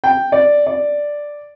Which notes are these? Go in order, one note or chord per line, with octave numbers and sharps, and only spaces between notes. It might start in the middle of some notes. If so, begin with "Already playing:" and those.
G5
D5
D5